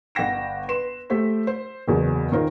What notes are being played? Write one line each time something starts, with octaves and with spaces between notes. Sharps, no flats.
G1 F#5 G5 A#6 E7
B4 C6 E7
A3 G4 C5 B6
C5
F#1 E2 C#3 F#3
D#3 C#4 F4 A#4 C5